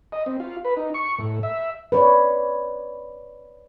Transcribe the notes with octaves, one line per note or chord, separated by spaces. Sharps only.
D#5
C4
F4
B4
D#4
C#6
A2
E5
B4 C#5 D5